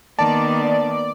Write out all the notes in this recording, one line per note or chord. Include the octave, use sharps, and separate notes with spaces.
D#3 A#3 B3 D5 A5